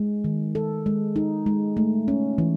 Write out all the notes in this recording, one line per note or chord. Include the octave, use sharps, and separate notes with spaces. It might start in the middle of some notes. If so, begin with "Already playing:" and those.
Already playing: G#3
D#3
A4
G#3
D#4
G#3
A3
C#4
E3